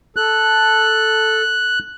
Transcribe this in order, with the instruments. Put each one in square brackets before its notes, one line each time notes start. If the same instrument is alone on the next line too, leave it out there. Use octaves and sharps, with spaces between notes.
[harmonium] A4 [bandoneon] F#6